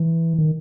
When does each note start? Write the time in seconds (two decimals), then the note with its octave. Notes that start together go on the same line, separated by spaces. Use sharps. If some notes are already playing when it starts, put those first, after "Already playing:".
Already playing: E3
0.38 D#3